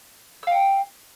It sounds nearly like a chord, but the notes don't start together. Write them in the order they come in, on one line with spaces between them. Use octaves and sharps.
E6 F5 G5